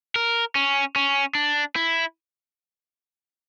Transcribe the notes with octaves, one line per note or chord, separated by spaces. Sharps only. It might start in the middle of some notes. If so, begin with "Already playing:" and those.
A#4
C#4
C#4
D4
E4